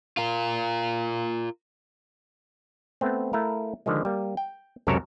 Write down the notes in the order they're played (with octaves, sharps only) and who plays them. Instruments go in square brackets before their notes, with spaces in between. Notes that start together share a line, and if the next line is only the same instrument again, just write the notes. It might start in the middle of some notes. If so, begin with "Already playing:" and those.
[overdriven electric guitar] F4 A#4
[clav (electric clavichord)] A3 B3 C4
A3 E4 A#4 F5
D3 D#3 F3 G#3
G3 A#3
G5
C#2 F#2 C3 A4 A#4 C#5